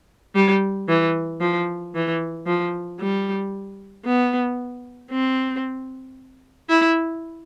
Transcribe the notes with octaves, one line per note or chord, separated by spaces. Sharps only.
G3
E3
F3
E3
F3
G3
B3
C4
E4